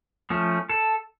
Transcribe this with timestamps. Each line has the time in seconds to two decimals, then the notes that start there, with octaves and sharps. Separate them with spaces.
0.30 F3 A3 C#4
0.69 A4